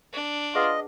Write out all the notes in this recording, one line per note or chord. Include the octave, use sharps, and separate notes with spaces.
D4
F4 G#4 B4 D#5 F#5